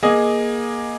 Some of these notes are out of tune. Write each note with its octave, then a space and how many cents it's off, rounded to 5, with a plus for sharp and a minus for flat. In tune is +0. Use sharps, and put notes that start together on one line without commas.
A#3 +20 G#4 +0 D#5 +0